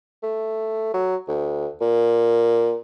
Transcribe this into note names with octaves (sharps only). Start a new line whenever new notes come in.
A3
F#3
D2
A#2